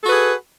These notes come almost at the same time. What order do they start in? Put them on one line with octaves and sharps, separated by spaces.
A4 F#4 B4 G#4